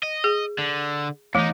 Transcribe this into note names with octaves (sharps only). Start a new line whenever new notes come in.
D#5
G#4
D3
E2 E3 A3 D#4